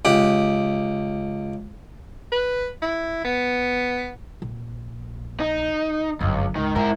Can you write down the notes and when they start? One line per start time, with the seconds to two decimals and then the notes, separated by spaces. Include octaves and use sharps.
0.05 C#2 G4 F#5
2.32 B4
2.82 E4
3.24 B3
4.42 A#1
5.40 D#4
6.20 G1 C#2 F#2
6.56 C#2 D#3
6.76 G#2 E4 A#4